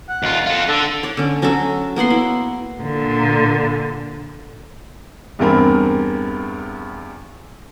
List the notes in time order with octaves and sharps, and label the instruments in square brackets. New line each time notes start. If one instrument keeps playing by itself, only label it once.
[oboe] F#5
[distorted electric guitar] D#2 F4
F4 A4
[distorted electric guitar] D3 [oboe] A4
[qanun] C#5 D5
D3 C#4
F#3 C#4 F#4 A4
A#3 B3 F#5 C6
E4
[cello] A#2 D3
[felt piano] E2 G2 C4 A#4 B5